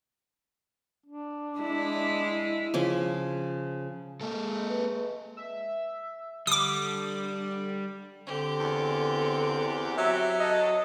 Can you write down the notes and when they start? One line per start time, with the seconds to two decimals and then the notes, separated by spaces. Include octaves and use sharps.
1.06 D4
1.59 G#3 E4
2.74 C#3 F3 C#4
4.21 G#3 A#3 A4
4.70 B4
5.37 E5
6.47 D3 G3 D6 D#6
8.27 D3 C4 G4
8.60 E2
9.98 F#3 E5
10.40 A4 D#5